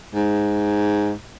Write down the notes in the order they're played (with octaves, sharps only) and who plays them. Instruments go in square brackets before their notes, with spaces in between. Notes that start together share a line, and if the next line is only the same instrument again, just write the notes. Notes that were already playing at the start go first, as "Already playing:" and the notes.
[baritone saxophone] G#2